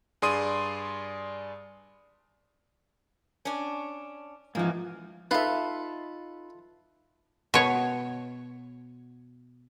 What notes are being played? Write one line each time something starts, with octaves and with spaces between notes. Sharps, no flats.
G2 G#4 D5 C6 D#6 D#7
C#4 D4
G#2 E3 F3 A#3
D#4 F4 A4 B4 E5
B2 C#5